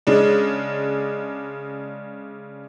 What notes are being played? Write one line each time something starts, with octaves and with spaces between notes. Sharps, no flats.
C#3 G#3 D4